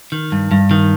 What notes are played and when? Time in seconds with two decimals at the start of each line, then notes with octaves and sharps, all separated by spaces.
0.12 D#3
0.32 G2
0.51 G2
0.71 D#3